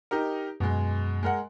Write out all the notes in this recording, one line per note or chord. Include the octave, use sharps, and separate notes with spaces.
D#4 G4 A#4
F#2 B2 G#3
G#3 A#4 F#5